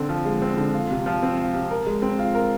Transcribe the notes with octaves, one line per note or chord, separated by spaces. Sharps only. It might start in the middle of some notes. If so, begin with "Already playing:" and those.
Already playing: D3 C4
F3
G#3
C4
D3
F4
C3
F3
C4
F4
C3
A#4
G#3
C4
F4
A#4